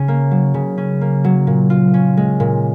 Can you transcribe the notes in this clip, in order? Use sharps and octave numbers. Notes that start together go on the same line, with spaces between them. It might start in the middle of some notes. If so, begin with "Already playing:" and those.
Already playing: C#3 C#4
A#3
F#3
C#3
C#4
A#3
F#3
A#2
F4
C#4
G#3
A#2